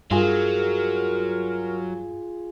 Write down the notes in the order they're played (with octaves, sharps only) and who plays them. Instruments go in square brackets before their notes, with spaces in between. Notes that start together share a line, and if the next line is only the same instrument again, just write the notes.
[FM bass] G2 [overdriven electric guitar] F#3 [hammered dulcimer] F4 G#4 [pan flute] A#4